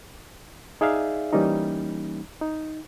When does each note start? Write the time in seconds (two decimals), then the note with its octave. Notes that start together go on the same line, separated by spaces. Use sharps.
0.81 D#4 G#4 D5 E5 F5
1.33 E3 G3 A#3 C#4 D#4
2.41 D#4